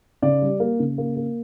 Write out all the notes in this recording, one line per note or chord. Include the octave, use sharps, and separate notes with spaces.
C#3 D5
G3
A#3
C#3
A#3
A#3